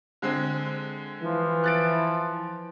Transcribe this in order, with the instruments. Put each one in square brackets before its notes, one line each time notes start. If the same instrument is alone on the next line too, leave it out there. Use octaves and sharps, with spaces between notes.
[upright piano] D3 G#3 C4
[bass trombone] E3 [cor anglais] F3
[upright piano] F#6 A6 D7